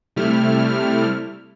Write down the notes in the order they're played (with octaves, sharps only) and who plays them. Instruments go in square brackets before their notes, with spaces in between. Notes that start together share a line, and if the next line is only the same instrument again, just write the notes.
[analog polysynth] C3 G3 A3 E4 F6